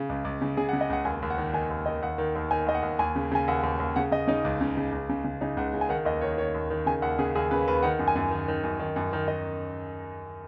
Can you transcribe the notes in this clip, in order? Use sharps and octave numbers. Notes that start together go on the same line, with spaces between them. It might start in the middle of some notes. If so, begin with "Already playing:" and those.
Already playing: C#3
C#2
C#2
C#3
C#3 G#4
F#5
C#3
D#5
C#2 F#5
D#2 G#5
D#2
F#5
D#3
D#3 G#5
D#2
D#3 D#5
D#2 F#5
D#3
D#2
D#3 G#5
D#2 D#5
F#5
D#2
D#2 G#5
C#3
C#3 G#5
D#2 F#5
D#2
D#2
C#3 F#5
C#3 D#5
C#3 D#4
C#2
C#3
C#3
C#2
C#3
C#3
C#3 D#4
C#2 F#5
C#3
G#5
D#3 F#5
D#2 D#5
D#3 C#5
D#3 C#5
D#2
D#3
C#3 G#5
D#2 F#5
C#3 G#4
D#2 G#4
C#3 B4
D#2 B4
D#3 F#5
F#2
G#5
F#2
D#3
D#3
F#2
D#3
F#2
D#3
D#3 D#5